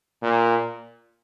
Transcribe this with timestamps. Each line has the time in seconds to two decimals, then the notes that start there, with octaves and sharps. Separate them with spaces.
0.23 A#2